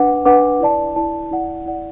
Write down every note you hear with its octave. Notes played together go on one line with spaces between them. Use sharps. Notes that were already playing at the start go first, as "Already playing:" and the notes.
Already playing: D4 B4 F#5 D6
D4 B4 F#5 D6
E4 D5 A5
E4 D5 A5
E4 D5 F#5
E4 D5 F#5